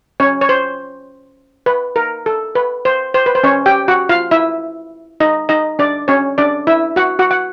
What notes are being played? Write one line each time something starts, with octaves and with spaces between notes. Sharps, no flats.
C#4 C#5
C#5
C5
B4
A#4
A4
B4
C5
C5
B4
C5
C#4 C#5
G4 G5
F#4 F#5
F4 F5
E4 E5
D#4 D#5
D#4 D#5
D4 D5
C#4 C#5
D4 D5
E4 E5
F#4 F#5
F#4 F#5
F#5